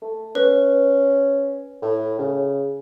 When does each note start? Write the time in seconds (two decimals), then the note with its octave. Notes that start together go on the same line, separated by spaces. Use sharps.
0.02 A3
0.35 C#4 B4
1.82 A2
2.19 C#3